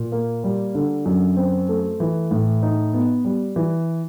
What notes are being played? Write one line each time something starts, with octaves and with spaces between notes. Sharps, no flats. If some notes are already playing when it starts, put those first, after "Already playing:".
Already playing: A#2
A#3
G3
D3
F#2
C4
A3
E3
A2
D#4
B3
G3
E3